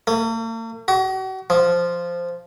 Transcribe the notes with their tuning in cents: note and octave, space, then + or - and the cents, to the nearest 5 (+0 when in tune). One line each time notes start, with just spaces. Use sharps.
A#3 -45
F#4 +40
F3 -5